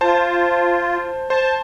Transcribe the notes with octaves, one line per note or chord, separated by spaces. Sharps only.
F4 C5 A5
C5 A5